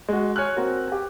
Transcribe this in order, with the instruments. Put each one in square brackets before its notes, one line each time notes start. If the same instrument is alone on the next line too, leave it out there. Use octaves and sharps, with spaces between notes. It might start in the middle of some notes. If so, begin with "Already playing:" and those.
[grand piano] G#3 F#4
C#5 G#5 F6 F#6
C4 F#4 A#4
G4 G#5